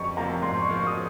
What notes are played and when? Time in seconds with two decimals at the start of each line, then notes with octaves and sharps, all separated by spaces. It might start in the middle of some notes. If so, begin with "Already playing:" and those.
Already playing: F2 C#6
0.17 C3 F3 A#3 A#5
0.42 G#2 C6
0.59 C#6
0.68 F3 A#3
0.76 C#6
0.87 D#6